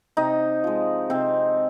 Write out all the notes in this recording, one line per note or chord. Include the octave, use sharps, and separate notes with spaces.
C3 D#4 D#5
F3 G#3
C3 C4 C5